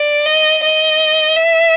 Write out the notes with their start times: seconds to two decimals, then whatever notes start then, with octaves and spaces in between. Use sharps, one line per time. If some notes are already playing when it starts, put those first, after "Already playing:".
Already playing: D5
0.26 D#5
0.64 D#5
1.36 E5